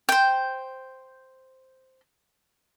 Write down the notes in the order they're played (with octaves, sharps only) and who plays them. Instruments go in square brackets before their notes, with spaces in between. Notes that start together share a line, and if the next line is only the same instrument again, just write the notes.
[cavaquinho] C5 G5